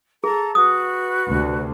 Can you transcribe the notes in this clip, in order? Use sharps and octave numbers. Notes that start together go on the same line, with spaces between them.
G#4 A4 A5 A#5
F#4 B4 D#6
D2 C3